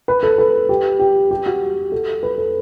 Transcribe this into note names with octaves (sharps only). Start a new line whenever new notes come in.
B4
A4
B4
G4
G4
G4
F#4
A4
B4
A4